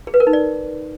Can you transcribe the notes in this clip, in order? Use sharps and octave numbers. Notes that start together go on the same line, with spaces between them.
G#4
B4
A#4
D#4
D5